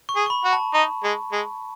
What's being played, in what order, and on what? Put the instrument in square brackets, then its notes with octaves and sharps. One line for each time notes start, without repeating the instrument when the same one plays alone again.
[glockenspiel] C#6
[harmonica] G#4
[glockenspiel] C#6
B5
[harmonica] F#4
[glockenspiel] A5
[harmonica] D#4
G#3
G#3